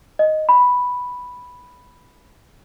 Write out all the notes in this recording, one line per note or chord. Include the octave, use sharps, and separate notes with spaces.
D#5
B5